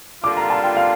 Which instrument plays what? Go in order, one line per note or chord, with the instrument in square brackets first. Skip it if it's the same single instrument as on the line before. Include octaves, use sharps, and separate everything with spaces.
[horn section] D3 G3 A#3 F4 [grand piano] D6
[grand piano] A#5
A5
G5
F5